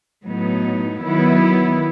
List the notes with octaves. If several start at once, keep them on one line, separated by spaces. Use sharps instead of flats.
A2 F#3 B3 D#4
D#3 F#3 B3 E4